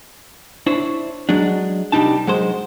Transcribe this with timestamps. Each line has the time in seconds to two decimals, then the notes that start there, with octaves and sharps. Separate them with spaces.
0.66 D4 E4 C5 C#5
1.29 F#3 G#3 D4
1.92 C2 E3 G3 D4 D#4 A5
2.27 F#3 G#3 C5